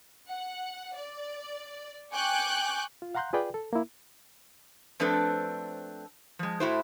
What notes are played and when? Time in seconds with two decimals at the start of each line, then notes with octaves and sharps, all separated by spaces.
0.29 F#5
0.95 D5
2.12 G5 G#5 C#6 D6 F#6 G6
3.02 F4
3.15 F5 F#5 A#5 C6 F#6 G6
3.33 F4 G#4 B4 D5 G5
3.54 A4
3.73 A#3 E4
5.00 F3 A3 C4 D4 A4 B4
6.39 F3 G#3
6.60 A2 A3 E4 F#4 C5